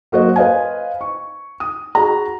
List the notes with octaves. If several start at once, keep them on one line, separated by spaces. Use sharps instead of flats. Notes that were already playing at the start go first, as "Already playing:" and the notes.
F#3 A#3 F#4 C5 D#5
B4 C5 D#5 F5 G#5
C#6
D#6
F#4 G#4 A#5